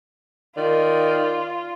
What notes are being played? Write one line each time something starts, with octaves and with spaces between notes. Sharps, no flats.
D#3 F4 D5